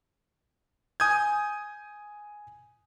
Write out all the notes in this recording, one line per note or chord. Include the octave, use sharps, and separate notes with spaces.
G#5 D#6 G6 G#6